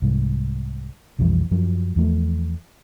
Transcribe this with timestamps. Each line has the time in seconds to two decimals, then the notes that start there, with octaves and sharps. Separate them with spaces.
0.02 C2 G#2
1.19 B1 F2 E3 G3
1.51 F#2 F3 F#3
1.96 E2 F3 A3